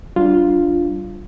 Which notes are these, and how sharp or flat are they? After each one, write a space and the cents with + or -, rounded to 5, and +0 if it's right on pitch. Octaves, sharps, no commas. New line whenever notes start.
G3 -35 D4 +0 F4 +0